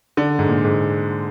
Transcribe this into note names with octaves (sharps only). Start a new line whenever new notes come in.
D3
G#2
A#2
G#2